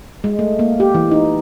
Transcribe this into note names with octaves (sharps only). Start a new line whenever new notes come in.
G#3
A3
A#3
G4
E3
D#4